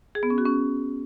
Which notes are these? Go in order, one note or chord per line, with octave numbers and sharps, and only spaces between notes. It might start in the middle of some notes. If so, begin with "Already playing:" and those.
G#4
B3
C#4
F#4
C#4